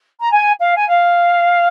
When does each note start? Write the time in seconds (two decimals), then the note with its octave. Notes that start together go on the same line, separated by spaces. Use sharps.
0.19 A#5
0.31 G#5
0.59 F5
0.75 G#5
0.87 F5